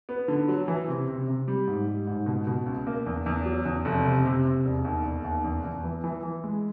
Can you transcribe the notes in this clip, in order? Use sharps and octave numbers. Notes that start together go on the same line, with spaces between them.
B3
D3
F#3
E3
C3
C3
C3
G3
G#2
G3
G#2
B2
B2
C#2
A#3
E2
E2
F#3
E2
F1
C3
C3
C3
E1
D#2
E1
D#2
E2
E2
E3
E3
E3
G#3